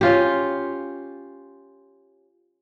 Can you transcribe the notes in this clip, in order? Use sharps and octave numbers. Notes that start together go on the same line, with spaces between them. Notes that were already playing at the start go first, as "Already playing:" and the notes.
C#4 F4 G4